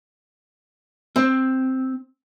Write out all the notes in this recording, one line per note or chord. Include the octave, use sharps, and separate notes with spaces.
C4